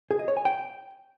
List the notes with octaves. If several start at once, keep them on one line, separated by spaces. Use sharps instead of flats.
G#4
D#5
C#5
G#5
G5